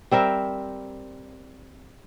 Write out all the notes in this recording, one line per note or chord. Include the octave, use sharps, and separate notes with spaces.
G3 C4 A#4 E5